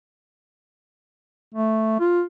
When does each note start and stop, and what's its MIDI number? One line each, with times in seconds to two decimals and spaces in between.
1.55 1.96 57
2.00 2.23 65